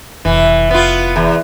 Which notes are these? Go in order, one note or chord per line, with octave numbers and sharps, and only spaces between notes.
F1 E3
B3 F4
E2